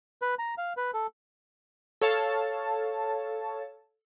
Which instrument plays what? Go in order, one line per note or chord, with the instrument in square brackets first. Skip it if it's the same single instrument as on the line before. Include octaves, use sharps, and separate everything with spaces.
[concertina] B4
A#5
F5
B4
A4
[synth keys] A4 C#5 F5 A5